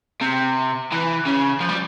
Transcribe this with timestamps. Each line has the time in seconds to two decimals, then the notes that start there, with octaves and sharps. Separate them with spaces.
0.21 C3
0.92 E3
1.27 C#3
1.61 F3
1.69 G3